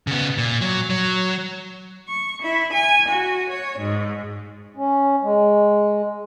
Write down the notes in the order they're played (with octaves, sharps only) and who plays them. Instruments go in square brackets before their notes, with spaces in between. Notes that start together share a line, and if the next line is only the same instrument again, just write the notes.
[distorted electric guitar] C#3 B3
A#2
F#3
F#3
[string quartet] C#6
E4
G#5
F#4
C#5
G#2
[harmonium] C#4
G#3